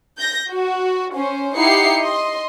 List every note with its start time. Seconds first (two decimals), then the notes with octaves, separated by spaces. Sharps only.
0.17 G6 A#6
0.50 F#4
1.14 C#4 C5
1.58 D#4 E4 G4 F#5 C7 C#7
1.99 D#5 C6